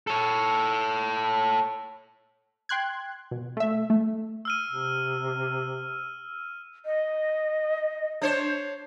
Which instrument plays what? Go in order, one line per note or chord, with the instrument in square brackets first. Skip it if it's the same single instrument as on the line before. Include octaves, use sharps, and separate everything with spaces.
[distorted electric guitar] A4 C#5
[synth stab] G5 C6 F#6 G#6
B2
A3 E5
A3
[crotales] E6 F6 D#7
[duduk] C3
[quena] D#5
[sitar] D4 C5 C#5